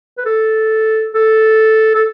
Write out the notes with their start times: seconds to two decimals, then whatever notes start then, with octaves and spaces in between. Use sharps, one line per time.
0.18 B4
0.26 A4
1.15 A4
1.95 A4